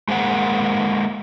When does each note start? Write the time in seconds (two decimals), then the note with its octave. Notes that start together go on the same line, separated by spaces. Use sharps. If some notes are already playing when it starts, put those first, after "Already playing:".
0.08 G#3 A#3 C5 F#5